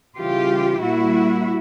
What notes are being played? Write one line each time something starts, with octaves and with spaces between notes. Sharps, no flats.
C#3 E3 G3 F4 G4
A#2 G3 A#3 E4 F#4